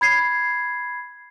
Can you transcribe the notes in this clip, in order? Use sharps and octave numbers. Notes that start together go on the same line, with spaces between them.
B5 G#6 C7